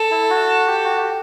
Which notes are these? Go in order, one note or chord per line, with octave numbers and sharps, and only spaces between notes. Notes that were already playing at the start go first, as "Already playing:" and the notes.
Already playing: A4
E4
F#4
G4
F#4
G4